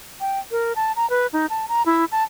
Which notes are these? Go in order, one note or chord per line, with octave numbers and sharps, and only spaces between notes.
G5
A#4
A5
A#5
B4
D#4
A5
A#5
E4
A5